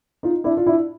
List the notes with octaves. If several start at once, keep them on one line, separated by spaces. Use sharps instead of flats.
D#4 F4
D4 E4
F4
D4 E4